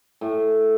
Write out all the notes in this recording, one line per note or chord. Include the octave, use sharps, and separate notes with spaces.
A2